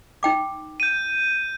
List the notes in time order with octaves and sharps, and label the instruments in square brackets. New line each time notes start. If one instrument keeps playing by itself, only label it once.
[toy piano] D#4 G5 D6
[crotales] G6 D#7